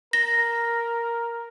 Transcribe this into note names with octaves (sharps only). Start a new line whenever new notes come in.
A#4 A#6